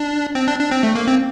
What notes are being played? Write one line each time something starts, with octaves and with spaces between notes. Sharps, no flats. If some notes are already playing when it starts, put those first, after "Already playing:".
Already playing: D4
C4
D4
D4
C4
A3
A#3
C4